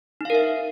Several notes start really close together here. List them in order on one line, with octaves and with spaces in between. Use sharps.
D#4 F5 A#4 E5